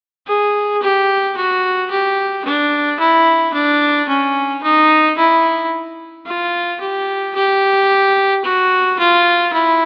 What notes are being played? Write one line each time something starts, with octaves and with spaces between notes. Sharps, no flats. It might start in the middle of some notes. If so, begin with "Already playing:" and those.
G#4
G4
F#4
G4
D4
E4
D4
C#4
D#4
E4
F4
G4
G4
F#4
F4
E4